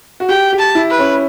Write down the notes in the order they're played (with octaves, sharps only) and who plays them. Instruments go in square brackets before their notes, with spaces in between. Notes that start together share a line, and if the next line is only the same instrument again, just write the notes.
[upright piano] F#4
[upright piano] G4 [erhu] G5
[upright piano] G4
[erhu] A5
[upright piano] E4
[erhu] B4
[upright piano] C#4